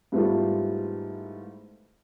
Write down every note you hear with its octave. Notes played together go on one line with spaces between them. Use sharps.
G#2 G3 A3 B3 E4 F4